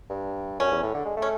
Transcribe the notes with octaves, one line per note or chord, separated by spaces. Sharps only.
G2
F#2 C#4
E2
A2
D3
G#3
A3
C#4